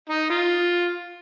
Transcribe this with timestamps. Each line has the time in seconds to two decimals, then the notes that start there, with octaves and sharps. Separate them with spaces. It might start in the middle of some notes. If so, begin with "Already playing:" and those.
0.10 D#4
0.30 F4